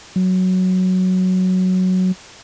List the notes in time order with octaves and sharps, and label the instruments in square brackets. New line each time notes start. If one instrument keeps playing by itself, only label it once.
[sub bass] F#3